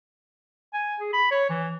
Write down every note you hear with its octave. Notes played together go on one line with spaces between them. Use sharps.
G#5
G#4
B5
C#5
E3